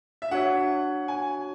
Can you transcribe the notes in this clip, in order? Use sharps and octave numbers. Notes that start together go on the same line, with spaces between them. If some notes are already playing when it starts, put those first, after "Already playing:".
E5
D4 F#4 C#5 F#5
G#5